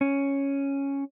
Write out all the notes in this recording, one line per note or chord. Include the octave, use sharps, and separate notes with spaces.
C#4